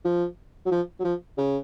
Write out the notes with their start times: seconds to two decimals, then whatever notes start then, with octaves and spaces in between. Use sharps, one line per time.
0.05 F3
0.66 F#3
0.71 F3
0.99 F#3
1.04 F3
1.38 C#3